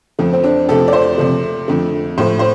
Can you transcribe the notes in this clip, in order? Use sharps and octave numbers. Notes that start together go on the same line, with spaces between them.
F2 F3 A3
C4
D4
F2 C3 A3 A4
D5
C5
C3 F3 A3
F2 D3 A3
A2 F3 A3 C5
C5